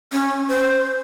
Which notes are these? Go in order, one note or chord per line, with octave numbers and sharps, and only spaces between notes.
C#4
C5